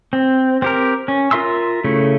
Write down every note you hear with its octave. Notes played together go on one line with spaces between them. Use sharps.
C4
C4 G4 A#4
C#4
F4 A#4 E5 C6 E6
C#3 A3 E4